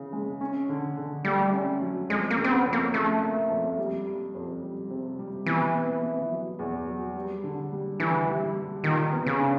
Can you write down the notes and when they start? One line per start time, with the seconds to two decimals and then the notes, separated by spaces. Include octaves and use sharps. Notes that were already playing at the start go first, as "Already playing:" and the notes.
Already playing: C#3 E3
0.13 G#3
0.41 C#4
0.69 D3
0.97 D3
1.25 G3 A3
1.53 C#4
1.81 F#3
2.09 F2 G#3
2.30 A#3
2.38 C#3
2.44 C4
2.52 B3
2.66 F2
2.73 A#3
2.94 C#3 A3
3.22 A#3
3.50 F2
3.78 G3
4.06 G3
4.35 F2
4.62 G3
4.90 C3
5.19 G3
5.46 B2 E3
5.75 B3
6.03 B3
6.31 F#3
6.59 E2
6.87 F#3
7.16 G3
7.44 D3
7.72 G3
7.99 D3 E3
8.28 G3
8.56 G3
8.84 A#2 D#3
9.12 B3
9.26 C#3
9.40 D4